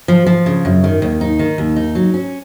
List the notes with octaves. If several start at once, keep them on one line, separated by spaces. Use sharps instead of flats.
F3
F3
C#3
F#2
D#3
D#2
D#4
D#3
D#2
D#4
F#3
C#4